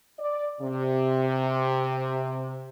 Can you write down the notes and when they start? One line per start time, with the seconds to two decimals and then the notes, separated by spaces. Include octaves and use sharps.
0.19 D5
0.61 C3